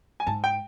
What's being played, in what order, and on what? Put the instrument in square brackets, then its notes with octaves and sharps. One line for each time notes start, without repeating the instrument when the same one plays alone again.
[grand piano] G#5
[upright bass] G#2 [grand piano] A5
[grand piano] G5